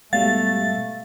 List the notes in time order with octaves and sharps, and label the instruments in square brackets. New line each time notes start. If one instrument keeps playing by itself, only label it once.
[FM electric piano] G#2 B2 G3 [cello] A3 [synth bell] F5 [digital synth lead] A6